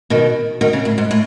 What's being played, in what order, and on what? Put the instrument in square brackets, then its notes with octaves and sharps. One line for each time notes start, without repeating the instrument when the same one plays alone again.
[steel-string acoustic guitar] B2 D#3
B2 D#3
C#3
A2
G#2
A2